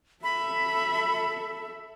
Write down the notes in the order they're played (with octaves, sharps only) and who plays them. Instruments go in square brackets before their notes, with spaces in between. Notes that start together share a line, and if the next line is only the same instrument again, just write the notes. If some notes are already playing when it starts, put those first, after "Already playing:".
[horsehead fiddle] A4 E5 [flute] B5